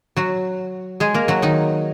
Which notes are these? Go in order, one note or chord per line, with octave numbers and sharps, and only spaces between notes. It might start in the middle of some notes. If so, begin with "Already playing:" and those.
F#3 F#4
G#3 G#4
A#3 A#4
F#3 F#4
D#3 D#4